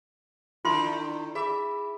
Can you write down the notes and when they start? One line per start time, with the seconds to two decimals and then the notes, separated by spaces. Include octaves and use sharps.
0.65 D3 D#3 E4 F4 C6
1.35 G#4 E5 B5 D6